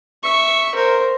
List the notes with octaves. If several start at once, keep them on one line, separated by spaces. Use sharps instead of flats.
E5 C#6
A#4 C5